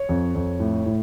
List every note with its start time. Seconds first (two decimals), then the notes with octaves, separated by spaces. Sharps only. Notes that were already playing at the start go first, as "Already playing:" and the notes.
Already playing: C#5
0.09 F2
0.35 F2
0.60 A2
0.86 A2